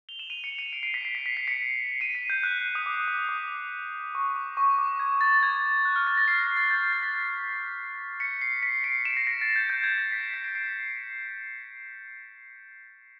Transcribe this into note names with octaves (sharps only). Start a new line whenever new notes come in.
F7 G7
E7 F#7
D#7 F7
C#7 D#7
C#7 D#7
C7 D7
C7 D7
B6 C#7
C7
B6
B6
C7
B6 C#7
C#7 D#7
B6
G6
F#6
D#6
D6
D6
D#6
D6
D6
C#6
D6
C#6
D6
G#6
A6
G#6
F#6
F6
A6
A#6
C7
A#6
A6
G6
A6
B6
B6 C#7
C7
B6 C#7
C7 D7
D7 E7
A#6
A#6
A6
G6
G6
G#6
A#6
B6
C7
B6 C#7
C7 D7
C7 D7